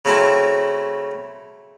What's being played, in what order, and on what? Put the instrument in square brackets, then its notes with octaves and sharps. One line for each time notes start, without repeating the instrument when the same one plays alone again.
[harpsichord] C#3 F#3 A3 C4 E4